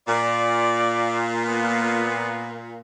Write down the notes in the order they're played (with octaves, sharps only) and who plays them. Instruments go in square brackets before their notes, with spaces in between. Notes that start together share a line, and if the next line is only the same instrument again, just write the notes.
[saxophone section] A#2 [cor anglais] D5
[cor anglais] B3